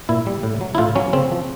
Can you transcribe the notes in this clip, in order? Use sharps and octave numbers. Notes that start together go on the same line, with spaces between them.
A#2 E4
G3
A2
F#3
E4
A2 F4
F#3 C#4
C#3 C4
F3